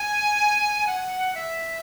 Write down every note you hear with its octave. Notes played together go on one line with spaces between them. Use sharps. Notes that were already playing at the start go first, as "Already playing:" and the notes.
Already playing: G#5
F#5
E5